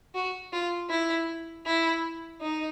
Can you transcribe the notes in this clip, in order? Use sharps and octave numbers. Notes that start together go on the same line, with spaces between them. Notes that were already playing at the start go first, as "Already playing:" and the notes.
F#4
F4
E4
E4
D#4